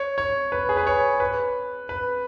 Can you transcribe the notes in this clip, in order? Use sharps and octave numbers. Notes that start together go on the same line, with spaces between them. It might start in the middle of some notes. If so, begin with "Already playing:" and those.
Already playing: C#5
C#5
B4
G#4
B4
C#5
B4
B4